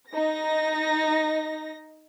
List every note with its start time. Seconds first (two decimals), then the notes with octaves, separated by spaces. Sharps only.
0.11 D#4 A#6